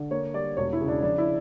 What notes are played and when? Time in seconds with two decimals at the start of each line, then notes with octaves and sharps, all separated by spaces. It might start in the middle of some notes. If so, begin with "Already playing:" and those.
Already playing: D3
0.11 A#3 C#5
0.34 G3 D5
0.57 E1 C#5
0.73 E4
0.81 C#3
0.88 D4
1.03 F3 D4
1.18 E4